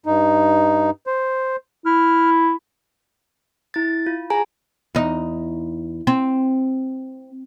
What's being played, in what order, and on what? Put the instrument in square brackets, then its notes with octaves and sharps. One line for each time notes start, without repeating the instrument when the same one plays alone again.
[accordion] G2 D#4
C5
[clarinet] E4 [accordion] F6
[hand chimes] E4 A6
F4
G#4 G#5 A#5
[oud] E2 D#4
C4